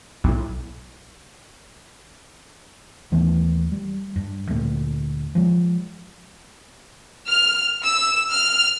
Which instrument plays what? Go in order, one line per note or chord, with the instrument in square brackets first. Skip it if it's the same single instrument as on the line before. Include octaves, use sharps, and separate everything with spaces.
[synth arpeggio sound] B1 A2
[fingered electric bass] D#2 E3 A3 B3
G3
G2
D2 A#2 A3
F3 G#3
[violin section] F6
E6
F6